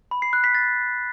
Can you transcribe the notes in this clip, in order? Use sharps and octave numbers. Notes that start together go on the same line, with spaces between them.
B5
C7
F#6
B6
A6